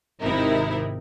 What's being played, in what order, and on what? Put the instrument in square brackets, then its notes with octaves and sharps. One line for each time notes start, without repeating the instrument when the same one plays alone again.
[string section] G#1 C3 D#4 E4 A#4